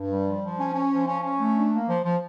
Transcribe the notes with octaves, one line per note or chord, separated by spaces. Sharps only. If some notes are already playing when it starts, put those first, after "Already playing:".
Already playing: G2
G3
F3
F3
C#4
C#4
F3
C#4
C#4
A3
D4
A#3
F3
F3